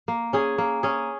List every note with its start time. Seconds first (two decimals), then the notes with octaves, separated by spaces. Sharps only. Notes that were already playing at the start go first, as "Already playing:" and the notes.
0.08 A#3
0.33 C#4 G#4
0.58 A#3
0.83 C#4 G#4